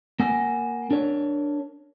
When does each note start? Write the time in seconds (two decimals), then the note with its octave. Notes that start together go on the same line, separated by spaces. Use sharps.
0.20 A#3 F#5 G#5
0.91 D4 A#4 C#5